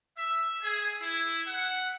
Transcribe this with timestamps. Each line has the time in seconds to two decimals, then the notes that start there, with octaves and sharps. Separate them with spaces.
0.16 E5
0.62 G#4
1.01 E4
1.47 F#5